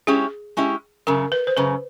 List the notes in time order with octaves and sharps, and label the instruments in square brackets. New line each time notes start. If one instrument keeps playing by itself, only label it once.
[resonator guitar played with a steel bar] G#3 C#4 E4 G4 [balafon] G#4
[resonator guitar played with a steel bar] G#3 C#4 E4 G4
[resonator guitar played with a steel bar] F#2 C#3 [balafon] A#4
[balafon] B4
C5
[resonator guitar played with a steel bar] F#2 C#3 [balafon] B4